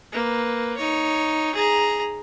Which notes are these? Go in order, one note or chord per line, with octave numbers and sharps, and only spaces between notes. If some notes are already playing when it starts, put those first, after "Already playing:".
A#3 B4
D#4 C#5
G#4 A#5